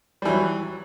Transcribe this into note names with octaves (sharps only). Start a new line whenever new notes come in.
E3 F#3 G3